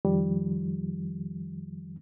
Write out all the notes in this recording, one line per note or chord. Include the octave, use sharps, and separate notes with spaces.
F2 D#3 F3 G3